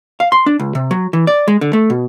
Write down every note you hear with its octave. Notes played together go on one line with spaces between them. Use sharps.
F5
C6
D4
C#2
C3
F#3
E3
D5
G#3
D3
A3
B2